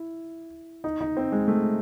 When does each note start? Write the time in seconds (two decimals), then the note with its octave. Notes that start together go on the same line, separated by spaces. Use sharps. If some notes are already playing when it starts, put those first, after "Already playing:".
Already playing: E4
0.84 D#4
1.01 D#4
1.17 C4
1.32 G#3
1.48 A3